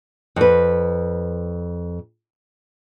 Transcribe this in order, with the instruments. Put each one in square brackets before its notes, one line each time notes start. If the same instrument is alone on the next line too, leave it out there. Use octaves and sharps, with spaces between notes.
[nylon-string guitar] F2 B4